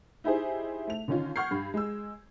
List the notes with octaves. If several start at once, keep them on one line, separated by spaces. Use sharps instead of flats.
D#4 E4 G4 G#4 C5
A3 F7
D3 D#3 C#4 D#4 F4
F#5 C#6 F6 G6 G#6 C7
G2
G#3 E6